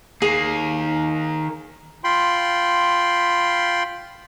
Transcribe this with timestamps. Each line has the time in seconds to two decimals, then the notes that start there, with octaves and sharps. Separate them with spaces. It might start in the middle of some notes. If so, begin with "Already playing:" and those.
0.22 D#3 A#3 G#4
2.04 F4 G5 B5 C6